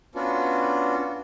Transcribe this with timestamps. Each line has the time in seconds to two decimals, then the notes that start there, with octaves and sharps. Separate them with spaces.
0.15 B3 C#4 D4 F4 F#4